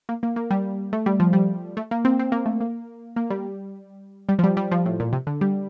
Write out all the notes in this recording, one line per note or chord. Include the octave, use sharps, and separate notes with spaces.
A#3
A#3
A#3
G3
A3
G3
F3
G3
A3
A#3
C4
C4
A#3
A3
A#3
A#3
G3
G3
F3
G3
G3
F3
A2
A#2
C3
D3
G3